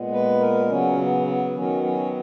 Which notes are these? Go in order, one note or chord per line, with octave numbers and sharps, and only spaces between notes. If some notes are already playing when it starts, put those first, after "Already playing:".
Already playing: A#2 G#3 B3
B4
A#4
C#3 F#3 B3 C#4
B3
B3
D#3 F#3 B3 C#4
C#4